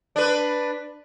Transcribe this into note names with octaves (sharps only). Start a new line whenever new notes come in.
D4 B4